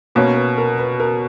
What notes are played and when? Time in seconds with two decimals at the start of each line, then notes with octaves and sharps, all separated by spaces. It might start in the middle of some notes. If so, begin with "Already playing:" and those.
0.15 B2 A#3 C#4 B4
0.36 B4
0.58 A#4
0.79 B4
1.00 A#4